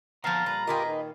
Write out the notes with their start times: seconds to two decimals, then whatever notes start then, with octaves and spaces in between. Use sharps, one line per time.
0.24 A#2 F3 B3 F5 A5 A#5
0.46 G3 B4 A#5
0.67 F4 G4 G#4 A#4 B4 D#5
0.86 D#3